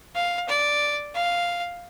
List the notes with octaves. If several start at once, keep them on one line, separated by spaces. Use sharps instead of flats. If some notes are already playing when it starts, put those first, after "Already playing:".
F5
D5
F5